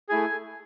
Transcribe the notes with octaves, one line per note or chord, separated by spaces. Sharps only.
A3 E4 G#4 G#5